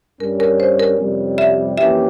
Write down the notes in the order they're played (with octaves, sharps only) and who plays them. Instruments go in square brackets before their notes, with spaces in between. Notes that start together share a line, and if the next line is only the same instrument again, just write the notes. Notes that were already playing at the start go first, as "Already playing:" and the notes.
[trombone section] G2 G3 C#4 [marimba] A#4
[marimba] A#4
C5
A#4
[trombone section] F2 C3 G3 C#4
[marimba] E5
[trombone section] F2 E3 A#3 C#4 G4 [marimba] E5